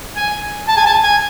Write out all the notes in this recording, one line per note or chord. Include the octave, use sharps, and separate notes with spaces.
G#5
A5
G#5
A5
G#5